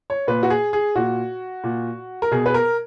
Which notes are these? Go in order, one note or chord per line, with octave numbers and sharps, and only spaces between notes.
C#5
A#2 B4
F#4
G#4
G#4
A#2 F#4
A#2
A#4
B2 G#4
B4
A#4